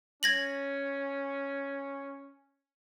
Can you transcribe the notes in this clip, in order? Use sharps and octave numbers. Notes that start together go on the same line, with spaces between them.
C#4 G#6 A#6 F#7